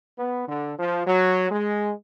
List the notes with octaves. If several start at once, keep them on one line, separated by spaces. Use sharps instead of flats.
B3
D3
F3
F#3
G#3